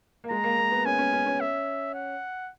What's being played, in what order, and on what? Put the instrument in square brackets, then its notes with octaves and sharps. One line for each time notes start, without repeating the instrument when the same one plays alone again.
[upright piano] A#3
[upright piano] G#3 [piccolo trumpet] A#5
[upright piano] A#3
A#3
B3
[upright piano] C#4 [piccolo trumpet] G#5
[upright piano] C#4
C#4
C#4
[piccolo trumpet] E5
F#5